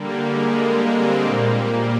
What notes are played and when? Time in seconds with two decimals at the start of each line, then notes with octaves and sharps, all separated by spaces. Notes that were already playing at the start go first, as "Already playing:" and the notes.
Already playing: D3 G3 A#3
0.25 G#3
0.92 G#3 C4
1.25 A#2 G3 A#3
1.58 A#3